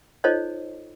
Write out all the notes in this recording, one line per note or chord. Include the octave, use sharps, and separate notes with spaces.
D#4 F4 A4 C5 C#5 D#5